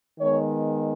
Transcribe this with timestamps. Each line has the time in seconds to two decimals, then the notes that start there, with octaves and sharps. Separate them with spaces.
0.19 D#3 G#3 B3 C#5